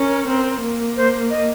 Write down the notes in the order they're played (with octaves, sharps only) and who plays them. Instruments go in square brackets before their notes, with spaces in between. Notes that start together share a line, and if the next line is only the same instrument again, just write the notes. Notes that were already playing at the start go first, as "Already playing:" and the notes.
Already playing: [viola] C#4 [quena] A#4
[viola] C4
A#3
[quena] C5
D#5